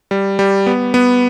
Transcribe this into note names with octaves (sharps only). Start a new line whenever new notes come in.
G3
G3
B3
B3